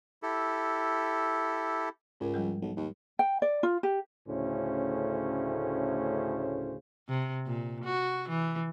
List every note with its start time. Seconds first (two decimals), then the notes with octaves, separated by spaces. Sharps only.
0.23 E4 G4 A4
2.20 C#2 G#2 A#4
2.34 F3 G3 G#3
2.62 B1
2.77 D#2
3.19 G5
3.42 D5
3.63 F4
3.83 G4
4.27 D2 A2 C#3 C#4 C5
7.09 C3
7.47 A#2
7.85 F#4
8.29 E3